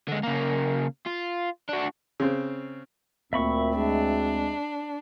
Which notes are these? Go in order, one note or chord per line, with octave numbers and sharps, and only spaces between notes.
D3 G#3
C#3 A#3
F4
D4 F#4
C#3 C4
D2 A#2 C4 E5 B5 C#6
G#3 D4